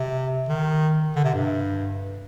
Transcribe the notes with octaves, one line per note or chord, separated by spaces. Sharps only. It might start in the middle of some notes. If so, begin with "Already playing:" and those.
Already playing: C3
D#3
D3
C3
G2